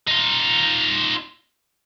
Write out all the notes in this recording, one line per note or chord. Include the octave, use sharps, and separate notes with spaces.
D#4 F4